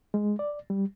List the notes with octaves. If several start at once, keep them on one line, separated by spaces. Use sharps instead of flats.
G#3
D5
G3